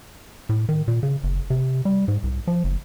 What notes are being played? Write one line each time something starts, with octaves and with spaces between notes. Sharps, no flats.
A2
D#3
A#2
C#3
F#1
C3
G3
G#2
C2
F3
F#1